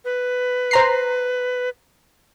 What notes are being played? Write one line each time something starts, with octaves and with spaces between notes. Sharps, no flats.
B4
C5 A#5 C7